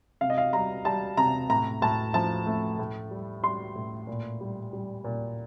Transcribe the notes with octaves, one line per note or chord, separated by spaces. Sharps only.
C3 F5
D#5
F5
G3 A#5
G3 A5
C3 A#5
A2 A#5
A2 A5
F3 A5
A3
A2
G3
G3 C6
A2
A#2
G3
G3
A#2